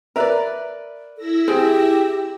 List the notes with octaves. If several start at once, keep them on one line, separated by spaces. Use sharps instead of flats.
A#4 B4 D5 E5 A#5
E4 A4 E6 A#6
C4 G4 G#4